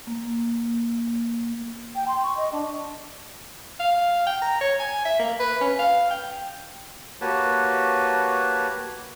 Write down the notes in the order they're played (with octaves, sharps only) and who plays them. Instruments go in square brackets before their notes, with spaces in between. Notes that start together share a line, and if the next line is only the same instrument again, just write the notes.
[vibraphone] A#3
[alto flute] G5
C6
C#6
D#5
D4
[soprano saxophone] F5
G5
A#5
C#5
G#5
E5
A#3
B4
C#4
F5
G5
[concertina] A#3 F#4 G4 B4 C#5 A5